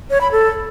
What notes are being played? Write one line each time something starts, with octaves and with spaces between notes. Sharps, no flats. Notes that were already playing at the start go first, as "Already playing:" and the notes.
C#5
B5
A4